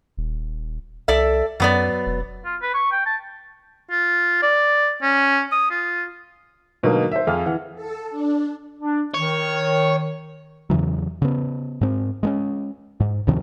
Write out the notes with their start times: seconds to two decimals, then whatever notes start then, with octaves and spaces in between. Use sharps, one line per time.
0.17 D#1
1.08 C2 A4 D5 E5
1.60 F#2 F#3 B3 D5
2.06 E1
2.45 F4
2.62 B4
2.74 C#6
2.92 G5
3.06 A5
3.91 F4
4.42 D5
5.02 C#4
5.52 D#6
5.71 F4
6.83 G#2 B2 D3 F#3 A#3 D#4
7.12 C5 E5
7.27 F2 G#4 F5 F6
7.46 E3 F#5
7.75 A4
8.10 D4
8.78 D4
9.14 D#3 C#5
10.70 E2 C#3 E3 F#3
11.22 C#3 B3
11.81 G#2 C4
12.23 G#3 A#3 C#4
13.00 G#2
13.27 D2 C3 D#3 F3